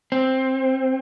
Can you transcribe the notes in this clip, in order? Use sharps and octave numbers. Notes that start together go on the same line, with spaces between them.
C4